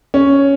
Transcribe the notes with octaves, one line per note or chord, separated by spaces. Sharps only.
C#4